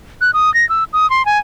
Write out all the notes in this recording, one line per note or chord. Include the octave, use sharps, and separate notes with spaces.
F#6
D#6
A#6
E6
D#6
C6
G#5